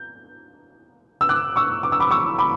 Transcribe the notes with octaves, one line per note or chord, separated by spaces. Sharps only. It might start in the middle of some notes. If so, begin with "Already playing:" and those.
Already playing: G6
E6
D6 F#6
C#6 E6
D6
E6
B5 D6
C#6 E6
B5 D6